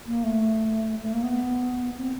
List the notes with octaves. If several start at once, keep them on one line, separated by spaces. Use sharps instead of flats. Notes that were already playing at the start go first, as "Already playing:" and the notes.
A#3
A3
A3
A#3
B3
C4